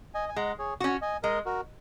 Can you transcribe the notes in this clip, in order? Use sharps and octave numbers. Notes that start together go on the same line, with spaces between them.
D#5 G#5
G#5
G#3 F#5 A#5
G#4 C#5
C#4 F#4
D#5 G#5
G#3 A#4 D#5
F#4 A#4